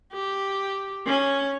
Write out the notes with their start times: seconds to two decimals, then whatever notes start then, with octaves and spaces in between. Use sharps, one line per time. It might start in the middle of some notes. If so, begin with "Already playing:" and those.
0.13 G4
1.06 C#4